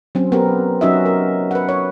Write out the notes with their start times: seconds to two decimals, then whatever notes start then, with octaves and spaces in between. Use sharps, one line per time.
0.15 F#3 C4 C#4
0.32 B3 C4 G4 A#4
0.81 F#3 C#4 D#4 F#4 D#5 E5
1.06 A#4
1.51 B4 F#5
1.69 C#5